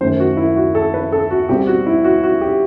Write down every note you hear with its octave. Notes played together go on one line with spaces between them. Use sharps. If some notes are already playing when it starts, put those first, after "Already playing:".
F#2 D#3 A3 C5
F#4
E4
F#4
A4
B4
A4
F#4
B2 G3 C4 G4
F#4
E4
F#4
F#4
G4